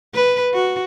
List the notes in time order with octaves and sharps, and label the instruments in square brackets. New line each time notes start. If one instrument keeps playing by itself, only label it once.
[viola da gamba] B4
F#4